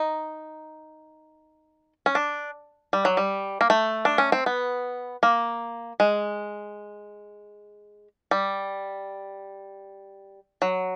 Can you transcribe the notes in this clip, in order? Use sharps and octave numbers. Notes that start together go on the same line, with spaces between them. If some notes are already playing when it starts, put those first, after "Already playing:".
Already playing: D#4
C#4
D4
G3
F#3
G3
A#3
A3
D4
C#4
C4
B3
A#3
G#3
G3
F#3